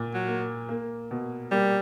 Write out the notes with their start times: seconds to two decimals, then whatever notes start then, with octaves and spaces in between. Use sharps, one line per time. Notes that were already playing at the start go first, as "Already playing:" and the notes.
Already playing: A#2
0.14 F#3
0.28 A#3
0.69 A#3
1.11 B2
1.51 G3 A#3